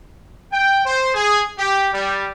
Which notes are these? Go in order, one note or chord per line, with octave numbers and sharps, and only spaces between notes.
G5
C5
G#4
G4
G3